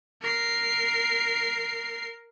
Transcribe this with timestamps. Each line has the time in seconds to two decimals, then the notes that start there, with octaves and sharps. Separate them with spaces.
0.22 A#4 C7